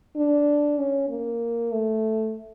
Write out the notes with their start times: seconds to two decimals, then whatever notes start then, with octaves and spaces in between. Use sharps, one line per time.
0.16 D4
0.79 C#4
1.10 A#3
1.72 A3